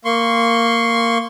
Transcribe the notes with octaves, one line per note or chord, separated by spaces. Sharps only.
A#3 C6 C#6